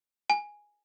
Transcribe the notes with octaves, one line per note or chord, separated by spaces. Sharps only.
G#5